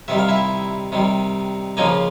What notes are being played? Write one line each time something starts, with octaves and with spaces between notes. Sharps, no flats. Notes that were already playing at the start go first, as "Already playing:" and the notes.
C3 D#3 G3 E5
F5
E4 E5
C3 D#3 G3
C#3 F3 A#3 C#4 D#4 D#5